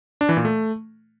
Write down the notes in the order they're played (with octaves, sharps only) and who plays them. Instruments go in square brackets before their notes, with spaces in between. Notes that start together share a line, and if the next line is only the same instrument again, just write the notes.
[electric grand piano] D4
E3
A#2
A3